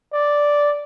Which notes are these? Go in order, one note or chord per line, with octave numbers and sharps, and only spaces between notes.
D5